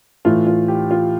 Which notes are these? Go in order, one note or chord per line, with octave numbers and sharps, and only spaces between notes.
A2 E3 A3 F4
F4
G4
F4